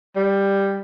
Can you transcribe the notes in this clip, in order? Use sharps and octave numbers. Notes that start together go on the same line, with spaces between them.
G3